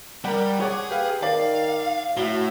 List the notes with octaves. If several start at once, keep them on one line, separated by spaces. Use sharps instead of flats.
G3 A#4 F#5
G#4 C#5 F#5 D6
G4 B4 F5
D#3 D5 F5
A2 F#4 E5 G7